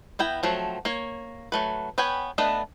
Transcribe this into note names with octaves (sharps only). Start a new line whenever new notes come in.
B3 E4 G5 A#5
F3 F#3 A3 C4
A#3 C#5
F#3 A3 B4
B3 B4 C#5 G5 G#5
A3 B3 D4 B4 D#5